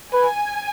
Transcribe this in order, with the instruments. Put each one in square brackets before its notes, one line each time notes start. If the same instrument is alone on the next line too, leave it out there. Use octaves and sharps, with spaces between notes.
[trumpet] B4 [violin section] G#5